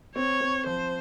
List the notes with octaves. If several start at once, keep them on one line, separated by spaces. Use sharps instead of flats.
C4 C#5
C4
F3 C5